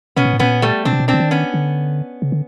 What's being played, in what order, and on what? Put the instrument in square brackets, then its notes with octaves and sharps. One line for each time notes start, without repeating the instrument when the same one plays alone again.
[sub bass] B2 [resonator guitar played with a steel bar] B3 C#4
[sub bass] A#2
A2
[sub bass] A#2 [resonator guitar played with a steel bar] B3 C#4
[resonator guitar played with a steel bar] G3 A3
[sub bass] B2 [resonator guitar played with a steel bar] C4 D4
[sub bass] C3
B2
[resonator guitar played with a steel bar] C4 D4
[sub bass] D3
D#3
[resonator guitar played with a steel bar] B3 C#4
[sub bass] D3
C#3
D3